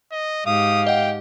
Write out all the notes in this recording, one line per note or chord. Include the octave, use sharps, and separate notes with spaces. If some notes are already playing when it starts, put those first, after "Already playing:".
D#5
G#2 G4 F5 D#6
D#5 F#5 G5